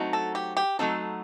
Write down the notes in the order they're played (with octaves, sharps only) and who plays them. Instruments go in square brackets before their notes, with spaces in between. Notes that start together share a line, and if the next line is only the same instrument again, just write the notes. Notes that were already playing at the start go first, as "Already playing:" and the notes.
Already playing: [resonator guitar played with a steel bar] F#3 A3 C4 D#4 F#4
[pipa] A4
G4
G4
[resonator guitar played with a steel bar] F#3 A3 C4 D#4 F#4 [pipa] A4